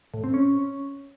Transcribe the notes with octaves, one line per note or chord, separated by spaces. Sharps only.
A2
C4
C#4